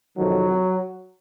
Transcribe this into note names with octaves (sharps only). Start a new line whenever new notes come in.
F2 C3 D#3 F#3